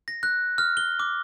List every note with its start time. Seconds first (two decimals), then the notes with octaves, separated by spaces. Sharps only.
0.08 A#6
0.23 F#6
0.58 F6
0.77 G7
0.99 D6